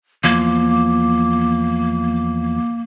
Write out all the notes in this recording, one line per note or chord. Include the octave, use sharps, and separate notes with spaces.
E2 F3 A#3